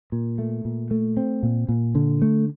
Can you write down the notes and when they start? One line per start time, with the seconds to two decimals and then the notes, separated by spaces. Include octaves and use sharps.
0.12 A#2
0.38 A3
0.65 A#2
0.91 A3
1.17 C4
1.43 A#2
1.69 A#2
1.95 D3
2.22 A3